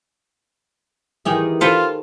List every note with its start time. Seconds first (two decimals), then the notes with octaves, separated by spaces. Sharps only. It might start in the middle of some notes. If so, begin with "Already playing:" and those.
1.25 D#3 E3 G4 G#4
1.61 F4 A4 B4 C5